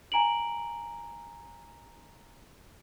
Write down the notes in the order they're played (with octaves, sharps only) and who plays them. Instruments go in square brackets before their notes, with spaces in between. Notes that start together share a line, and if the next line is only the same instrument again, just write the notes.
[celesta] G#5 A#5 D7 F#7